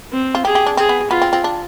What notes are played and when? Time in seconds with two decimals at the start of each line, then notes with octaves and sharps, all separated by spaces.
0.12 C4
0.35 F4
0.45 G4 G#4
0.55 G4
0.66 D4
0.77 C4 G#4
0.89 B3
1.10 B3 F4
1.22 C4
1.33 C4
1.44 D4